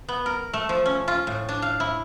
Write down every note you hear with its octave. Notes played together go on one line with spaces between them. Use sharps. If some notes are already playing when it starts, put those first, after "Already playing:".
B3
A#4
A3
F3
C#4
F4
A2
D4
F5
E4